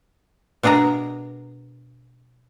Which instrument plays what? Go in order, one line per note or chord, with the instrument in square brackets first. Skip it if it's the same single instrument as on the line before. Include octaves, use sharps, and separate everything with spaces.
[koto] B2 D4 G#4 A#4 A#5